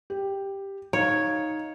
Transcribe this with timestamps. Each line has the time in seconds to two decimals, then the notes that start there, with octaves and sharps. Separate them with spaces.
0.10 G4
0.93 D#4 C#5 F5